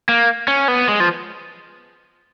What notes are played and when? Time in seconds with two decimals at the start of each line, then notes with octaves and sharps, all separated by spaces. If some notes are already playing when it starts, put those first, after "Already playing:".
0.09 A#3
0.48 C#4
0.68 B3
0.89 G#3
1.00 F3